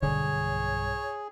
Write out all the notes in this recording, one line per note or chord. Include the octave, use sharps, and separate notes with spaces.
B1 G2 D3 G#4 C#5